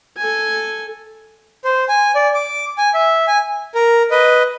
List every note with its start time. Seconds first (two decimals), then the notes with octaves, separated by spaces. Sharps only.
0.17 A4 G#5
1.65 C5
1.89 G#5
2.15 D5
2.35 D6
2.78 G#5
2.94 E5
3.28 G#5
3.75 A#4
4.11 B4 D#5